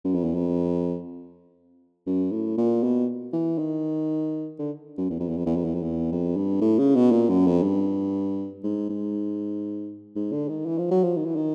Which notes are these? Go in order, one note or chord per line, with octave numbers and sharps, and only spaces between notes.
F#2
F2
E2
F2
F#2
A2
A#2
B2
E3
D#3
D3
F#2
E2
F2
E2
F2
E2
F2
E2
F2
E2
F2
G2
A2
C#3
B2
A#2
F#2
F2
G2
G#2
G#2
G#2
D3
D#3
E3
F3
F#3
F3
D#3
E3
D#3